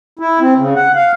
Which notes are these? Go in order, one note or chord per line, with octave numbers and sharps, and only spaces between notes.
E4
C4
C#3
F#5
F5